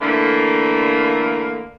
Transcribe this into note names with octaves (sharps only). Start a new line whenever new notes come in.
D3 E3 A3 A#3